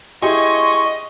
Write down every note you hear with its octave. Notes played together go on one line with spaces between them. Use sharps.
E4 G4 G#4 D#5 C6 C#6